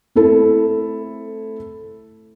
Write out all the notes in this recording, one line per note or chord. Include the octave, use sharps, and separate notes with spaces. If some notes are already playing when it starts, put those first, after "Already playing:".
A3 C4 E4 A4